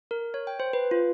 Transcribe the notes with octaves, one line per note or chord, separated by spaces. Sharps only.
A#4
C#5
G5
C5
B4
F4